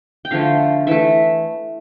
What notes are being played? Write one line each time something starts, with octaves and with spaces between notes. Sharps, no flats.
G5
D3 F3 A3 F5
E3 A3 E5